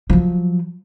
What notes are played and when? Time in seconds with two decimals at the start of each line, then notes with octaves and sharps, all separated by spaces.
0.10 F3 F#3